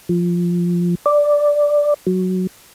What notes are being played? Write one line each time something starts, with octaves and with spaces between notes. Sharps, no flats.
F3
D5
F#3